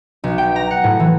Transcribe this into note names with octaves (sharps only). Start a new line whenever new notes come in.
B1
G5
A#5
F#5
A2
E3